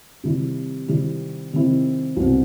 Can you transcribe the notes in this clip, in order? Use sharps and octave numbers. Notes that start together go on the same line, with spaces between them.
C3 D#3 G3 C4 E4
C3 D#3 G3 C4 E4
C3 D#3 G3 C4 E4
C2 B2 G3 C4